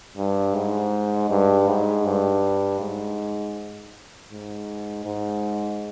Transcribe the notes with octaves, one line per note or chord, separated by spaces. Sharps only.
G2
G#2
G2
G#2
G2
G#2
G#2
G#2